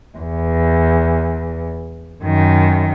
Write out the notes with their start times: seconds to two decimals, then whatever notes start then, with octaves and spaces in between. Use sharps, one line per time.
0.18 E2
2.24 F#2 D#3